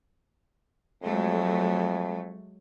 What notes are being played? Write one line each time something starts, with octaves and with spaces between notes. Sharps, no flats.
F2 F#3 G#3 A3